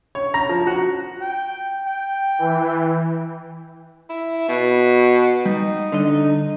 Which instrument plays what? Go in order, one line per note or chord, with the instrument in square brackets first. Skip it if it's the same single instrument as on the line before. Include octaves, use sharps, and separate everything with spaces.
[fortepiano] C#5
A#5
F3
F#4
[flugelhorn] G5
G5
[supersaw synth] E3
[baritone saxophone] E4
B2
[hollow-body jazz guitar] G3 [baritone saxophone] D#4
[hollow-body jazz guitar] D3 D#5